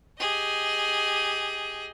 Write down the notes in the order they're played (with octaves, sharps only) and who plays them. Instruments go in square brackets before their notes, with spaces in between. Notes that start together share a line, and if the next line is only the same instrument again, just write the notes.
[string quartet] G4 G#4 D#5